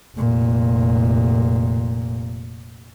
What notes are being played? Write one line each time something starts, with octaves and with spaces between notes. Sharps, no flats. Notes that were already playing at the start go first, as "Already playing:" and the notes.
F1 A#2